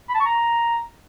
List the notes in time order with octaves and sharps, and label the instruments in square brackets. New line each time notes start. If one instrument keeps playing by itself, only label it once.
[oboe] B5
A5
C#6
A#5